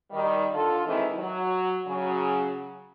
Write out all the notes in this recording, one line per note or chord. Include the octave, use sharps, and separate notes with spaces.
D#3 G3
D3 F4 A4
D#2 D#3 E3 G#3 C4 E4
F#3
C#3 F#3